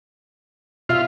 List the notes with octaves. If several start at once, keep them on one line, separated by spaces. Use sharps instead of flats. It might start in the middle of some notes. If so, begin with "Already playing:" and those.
B2 F4 E5 F5